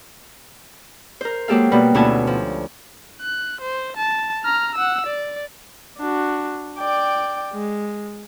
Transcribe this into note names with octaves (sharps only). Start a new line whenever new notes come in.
A#4 C5
F#3 G#3 A#3 G4 A4 F5
B2 G3 A#3 B4
D2 B2 C#4 E4 G#5 A5
F3
F#6
C5
A5
A#5 F6
F#5 E6
D5
D4 F#4
D5 G5
G#3